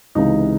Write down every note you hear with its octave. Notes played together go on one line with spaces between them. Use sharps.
C#2 C3 E3 G#3 D#4